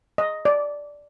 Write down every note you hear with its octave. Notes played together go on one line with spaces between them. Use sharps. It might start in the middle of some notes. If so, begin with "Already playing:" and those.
D#5
D5